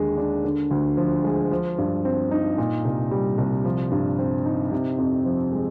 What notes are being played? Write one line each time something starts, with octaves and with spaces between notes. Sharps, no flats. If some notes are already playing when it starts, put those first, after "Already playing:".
Already playing: D#2 D3 G#3
D4
D3
D2
F3
G#3
F3
G2
C4
D#4
A#2
C2
G3
C2
F3
G2
C4
D#4
C3
F2
F3
G#3